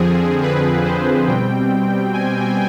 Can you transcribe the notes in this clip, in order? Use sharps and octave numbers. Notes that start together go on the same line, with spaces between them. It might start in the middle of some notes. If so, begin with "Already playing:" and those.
Already playing: F2 D3 F3 C4 G#4
B4
C5
B2 G3 C4 G5
G#5